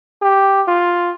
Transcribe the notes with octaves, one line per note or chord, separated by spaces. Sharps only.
G4
F4